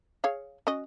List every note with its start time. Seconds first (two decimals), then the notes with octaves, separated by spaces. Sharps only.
0.24 G#4 C#5 F5
0.67 C#4 F#4 D#5